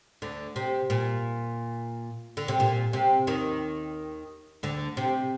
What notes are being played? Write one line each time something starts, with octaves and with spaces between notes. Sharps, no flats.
D2 D3
C3
A#2
D3
C3
A#2
C3
D#2 D#3
D2 D3
C3